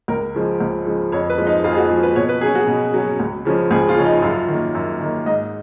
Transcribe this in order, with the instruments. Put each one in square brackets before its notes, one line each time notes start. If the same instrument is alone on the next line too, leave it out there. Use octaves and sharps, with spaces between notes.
[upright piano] C#2 A#4
C#3 F3 G#3
C#2
C#3 F3 G#3
F2 C#5
B4
F3 G#3
D#4
F2 F4
G#4
F#4
F3 G#3 G#4
B4
B2 C#5
B4
F#3 C#4 G#4
F#4
B2
F#3 C#4
C#2
C#3 F3 G#3 C#4
C#2 G#4
F4
C#3 F3 G#3 C#4
D#4
F#2 F4
D#3 A#3
F#2
D#3 A#3
G#2 D#5